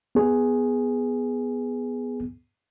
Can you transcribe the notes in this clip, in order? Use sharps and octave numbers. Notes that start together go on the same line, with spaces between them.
B3 G#4